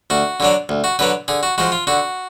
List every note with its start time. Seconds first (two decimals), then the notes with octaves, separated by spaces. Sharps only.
0.10 D2 F#4
0.40 D3 F#3 D4
0.69 D2
0.84 F#4
0.99 D3 F#3 D4 B4
1.28 D3 G#4
1.43 F#4
1.58 F3 G#3 F#4
1.72 F4
1.87 D3 F#4